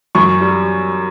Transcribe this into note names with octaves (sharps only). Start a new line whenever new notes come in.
F#2 C#6
G3